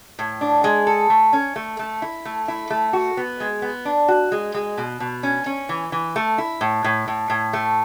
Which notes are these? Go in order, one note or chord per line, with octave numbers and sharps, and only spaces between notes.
A2
D4
G#3
A4
A3
C#4
A3
A3
E4
A3
E4
A3
F#4
B3
G#3
B3
D4
F#4
G#3
G#3
B2
B2
C#4
C#4
E3
E3
A3
E4
A2
A2
A2
A2
A3